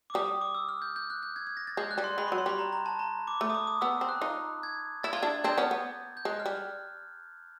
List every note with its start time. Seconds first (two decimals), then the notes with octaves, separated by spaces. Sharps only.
0.10 D6
0.14 G3 D#6
0.28 D#6
0.41 D6
0.55 E6
0.69 F6
0.82 G6
0.96 G6
1.10 F#6
1.23 G6
1.36 G#6
1.47 G#6
1.57 A#6
1.67 A6
1.77 G#3 G6
1.91 F#6
1.98 G3
2.04 C6
2.18 G#3 B5
2.28 C#6
2.32 F#3
2.38 C6
2.46 G3 B5
2.59 A#5
2.73 A#5
2.86 A5
2.99 A#5
3.27 D6
3.41 A3 D6
3.50 D#6
3.55 D6
3.67 D#6
3.81 B3 E6
4.01 C4
4.09 F#6
4.21 D#4 F4
4.63 G#6
5.03 E4 A6
5.13 F4 G#6
5.23 D4 E4
5.30 G#6
5.44 C4 D4 G6
5.58 B3 C#4
5.71 B3
6.17 G6
6.25 G#3 F#6
6.40 F6
6.46 G3